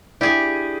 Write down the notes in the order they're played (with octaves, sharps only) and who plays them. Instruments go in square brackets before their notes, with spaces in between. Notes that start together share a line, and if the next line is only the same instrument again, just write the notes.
[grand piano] D4 E4 D5 [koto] G4 G#4